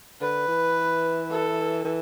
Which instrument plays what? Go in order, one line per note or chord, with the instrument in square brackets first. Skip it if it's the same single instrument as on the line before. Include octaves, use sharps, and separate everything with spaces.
[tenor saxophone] D3 [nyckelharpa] B4
[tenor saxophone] E3
[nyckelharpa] A4
[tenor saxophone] E3